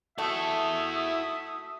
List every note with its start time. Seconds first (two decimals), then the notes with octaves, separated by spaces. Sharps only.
0.18 A3 E4 F#4 E5 F#5 D#6